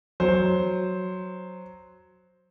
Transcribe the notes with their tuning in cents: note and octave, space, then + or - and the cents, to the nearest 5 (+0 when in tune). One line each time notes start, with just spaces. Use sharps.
F#3 +0 C5 +0